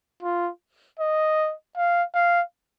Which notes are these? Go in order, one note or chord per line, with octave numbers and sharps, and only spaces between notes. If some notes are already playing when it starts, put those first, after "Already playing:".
F4
D#5
F5
F5